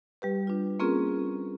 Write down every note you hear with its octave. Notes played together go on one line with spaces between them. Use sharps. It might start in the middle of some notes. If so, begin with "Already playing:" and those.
G3 G4 B4
D4 F4
A#3 C4 C#4 F4 G#4 A#4